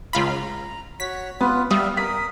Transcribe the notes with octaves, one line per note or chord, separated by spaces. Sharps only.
C#2 F4 A#5 B5
F#4 C#5 B6
B3 F4 B4
G3 E5 F5 D#6
A#4 D#6 B6